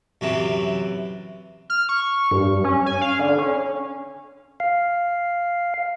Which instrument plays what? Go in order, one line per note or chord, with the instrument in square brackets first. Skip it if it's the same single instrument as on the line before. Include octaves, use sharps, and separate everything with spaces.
[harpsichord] F#2 C3 E3
[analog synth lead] F6
C#6
G2
C#4
G#5
F5
D3
C#4
[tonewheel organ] F5